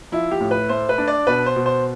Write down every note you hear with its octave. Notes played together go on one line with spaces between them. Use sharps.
F3 E4
G4
A2
B4
A3 C5
B4
D4
D5
B2 B4
C5
B2
C5